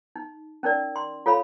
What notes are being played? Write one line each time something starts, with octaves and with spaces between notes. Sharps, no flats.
D#4
C#4 D#4 A#4 D5
C6
F4 A4 C#5 F5 B5